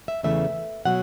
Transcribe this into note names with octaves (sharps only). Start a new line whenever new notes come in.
E5
E2 C#3 E3 A3 E5
B2 F#3 F#5